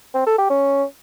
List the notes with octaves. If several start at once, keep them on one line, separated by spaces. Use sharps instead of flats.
C4
A4
G4
C#4